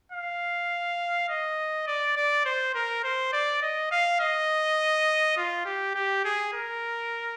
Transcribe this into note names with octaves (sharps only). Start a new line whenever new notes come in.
F5
D#5
D5
D5
C5
A#4
C5
D5
D#5
F5
D#5
F4
G4
G4
G#4
A#4